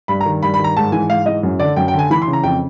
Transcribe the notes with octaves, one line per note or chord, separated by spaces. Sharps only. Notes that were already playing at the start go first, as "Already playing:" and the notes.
G2 B5
A#5
D#3
G2 B5
B5
D#3
A#5
G#2 A5
E3 G#5
G#2 F5
E3 D#5
F#2
D3 D5
F#2 G5
G5
D3 G#5
E3 B5
C6
C#3
A#5
F2 G5